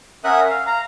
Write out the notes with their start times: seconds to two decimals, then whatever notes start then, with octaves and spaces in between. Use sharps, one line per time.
0.24 C#4 A#4 E5 F#5 D#6 F#6
0.50 F5
0.67 F5 A#5